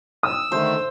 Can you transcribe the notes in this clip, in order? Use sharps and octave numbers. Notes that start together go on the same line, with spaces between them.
D#6 E6
D3 D#3 A3 C5